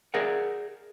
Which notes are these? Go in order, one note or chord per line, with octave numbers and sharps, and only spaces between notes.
G#4 A#4 D5 E5 F#5